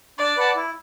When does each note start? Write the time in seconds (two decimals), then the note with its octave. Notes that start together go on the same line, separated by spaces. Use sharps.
0.18 D4 D5
0.37 B4 F#5 A5
0.55 E4